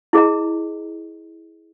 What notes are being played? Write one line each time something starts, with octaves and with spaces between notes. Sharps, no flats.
E4 G#4 D#5 A#5